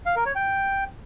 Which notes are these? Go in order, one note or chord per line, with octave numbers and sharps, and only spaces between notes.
F5
A#4
C#5
G5